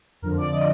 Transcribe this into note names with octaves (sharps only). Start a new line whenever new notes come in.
F2 D3 F3 A#4
D5
D#5